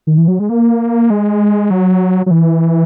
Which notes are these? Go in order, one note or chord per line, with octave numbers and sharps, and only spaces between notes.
D#3
E3
F#3
G#3
A#3
G#3
F#3
F#3
E3